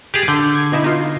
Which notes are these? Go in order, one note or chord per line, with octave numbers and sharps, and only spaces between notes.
G4 G#4 A6
D3 G6
G#6
B2 D#4 E4
D#4 F4 C7